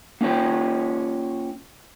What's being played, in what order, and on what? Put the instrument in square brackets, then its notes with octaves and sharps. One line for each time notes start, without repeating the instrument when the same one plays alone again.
[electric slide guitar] A#3 C#4 F4 C#5 G5